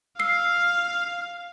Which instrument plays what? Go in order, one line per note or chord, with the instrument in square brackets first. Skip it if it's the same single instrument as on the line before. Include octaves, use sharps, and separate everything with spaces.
[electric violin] F5 [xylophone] E6 C7